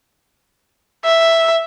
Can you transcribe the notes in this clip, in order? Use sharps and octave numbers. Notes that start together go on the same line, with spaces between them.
E5